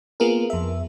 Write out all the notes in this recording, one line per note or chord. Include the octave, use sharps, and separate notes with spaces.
A#3 B3 F4 G#4 A#4
F2 E5